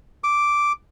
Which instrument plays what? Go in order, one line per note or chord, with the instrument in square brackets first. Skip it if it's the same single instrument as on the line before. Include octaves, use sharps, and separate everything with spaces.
[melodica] D6